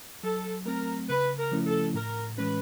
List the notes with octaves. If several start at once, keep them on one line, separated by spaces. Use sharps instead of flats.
F#3 A4
A3 C4 A#4
C#3 B4
A#4
F3 A3 C#4 E4
A4
A2 A#4
E3 G#3 C#4 B4